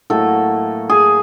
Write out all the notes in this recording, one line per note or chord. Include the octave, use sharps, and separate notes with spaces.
A2 F#3 A#3 A4
G#4